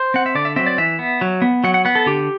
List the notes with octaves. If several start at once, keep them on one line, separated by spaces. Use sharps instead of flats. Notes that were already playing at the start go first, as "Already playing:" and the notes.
Already playing: C5
C4 F#5
E5
D3 D5
E5
F#3 C4 E5
D5
E3 E5
B3
F#3
B3
F#3 F#5
F#5
B3 F#5
A4
D3 G4